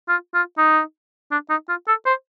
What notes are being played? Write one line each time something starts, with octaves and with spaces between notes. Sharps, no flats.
F4
F4
D#4
D4
D#4
F4
A4
C5